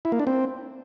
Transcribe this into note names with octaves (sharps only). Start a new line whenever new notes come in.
E4
A#3
D4
C4